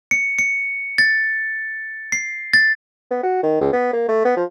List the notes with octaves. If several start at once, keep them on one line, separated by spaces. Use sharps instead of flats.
C#7
C#7
A6
C7
A6
B3
F#4
D#3
C#2
B3
A#3
A3
B3
F3